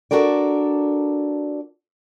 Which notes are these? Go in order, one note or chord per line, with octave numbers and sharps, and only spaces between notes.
D4 F#4 A4 A#4 D5